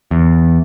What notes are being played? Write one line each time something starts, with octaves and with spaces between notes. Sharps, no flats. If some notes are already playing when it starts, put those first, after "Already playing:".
E2